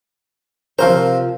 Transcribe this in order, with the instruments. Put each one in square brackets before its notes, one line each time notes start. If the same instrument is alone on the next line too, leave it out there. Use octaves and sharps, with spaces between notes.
[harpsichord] C3 F4 A#5 [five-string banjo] F3 A#4 C5